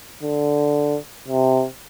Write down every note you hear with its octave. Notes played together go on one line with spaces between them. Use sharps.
D3
C3